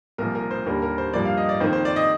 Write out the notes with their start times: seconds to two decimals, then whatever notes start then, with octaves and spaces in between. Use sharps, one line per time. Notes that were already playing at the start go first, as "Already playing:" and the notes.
0.18 C2 A#2 F3 A#4
0.35 A#4
0.51 C5
0.66 D#2 D3 G3 A#3 A#4
0.82 A#4
0.98 C5
1.13 G2 F3 A#3 D5
1.25 F5
1.37 D#5
1.49 D5
1.60 F2 D#3 A#3 C5
1.73 C5
1.85 D5
1.96 D#5